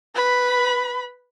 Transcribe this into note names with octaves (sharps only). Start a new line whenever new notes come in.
B4 B5